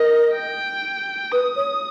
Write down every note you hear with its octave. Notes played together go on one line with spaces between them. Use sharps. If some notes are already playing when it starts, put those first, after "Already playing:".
Already playing: A#4 D#5
G5
B4 D#6
C#5